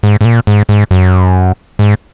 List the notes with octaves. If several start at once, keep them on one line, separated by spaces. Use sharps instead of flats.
G#2
G#2
A#2
G#2
G#2
F#2
G#2